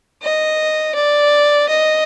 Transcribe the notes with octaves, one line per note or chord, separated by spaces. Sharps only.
D#5
D5
D#5